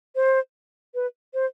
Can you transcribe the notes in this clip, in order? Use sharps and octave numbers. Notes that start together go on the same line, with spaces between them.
C5
B4
C5